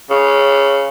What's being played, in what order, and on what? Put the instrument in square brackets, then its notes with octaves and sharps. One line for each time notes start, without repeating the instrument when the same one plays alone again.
[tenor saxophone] C#3